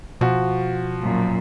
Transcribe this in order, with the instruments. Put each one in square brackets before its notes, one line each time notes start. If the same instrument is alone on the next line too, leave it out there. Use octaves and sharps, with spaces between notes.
[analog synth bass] B2 [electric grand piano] F3 F#4
[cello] F#2 A#2